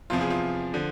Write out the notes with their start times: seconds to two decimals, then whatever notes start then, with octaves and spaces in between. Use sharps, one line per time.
0.10 E2 C3 F3 F4
0.21 G#4
0.30 F4
0.74 D3 F3